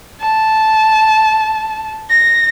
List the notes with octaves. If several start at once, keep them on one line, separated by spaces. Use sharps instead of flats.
A5
A#6